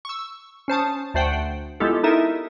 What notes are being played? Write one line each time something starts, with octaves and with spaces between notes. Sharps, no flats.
C#6 E6
C#4 C5 A5 D#6
D2 A3 C5 F#5 G5
G#3 B3 E4 F4 G4 A4
D#4 E4 A4 A#4 E5